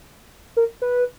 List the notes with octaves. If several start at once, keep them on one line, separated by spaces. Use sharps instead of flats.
A#4
B4